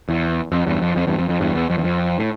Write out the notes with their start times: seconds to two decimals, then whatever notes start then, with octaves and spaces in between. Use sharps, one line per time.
0.09 E2
0.52 F2
0.67 E2 G2
0.82 F2
0.96 F2
1.07 E2 G2
1.18 F2
1.29 F2
1.40 E2 G2
1.55 E2
1.70 F2
1.78 E2
1.84 F2
2.19 A2